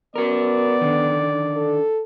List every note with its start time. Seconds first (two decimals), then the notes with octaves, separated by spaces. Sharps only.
0.16 B3 F#4 A#4 D5
0.81 D3 D#3
1.57 A4